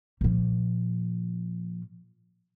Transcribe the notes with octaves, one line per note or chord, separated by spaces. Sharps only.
A#2 F3